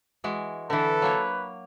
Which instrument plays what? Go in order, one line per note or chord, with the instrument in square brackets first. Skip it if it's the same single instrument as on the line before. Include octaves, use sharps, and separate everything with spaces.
[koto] E3 G#3 F#4
[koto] D3 E3 [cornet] A4 [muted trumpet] B4
[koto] F#3 A#3 C#5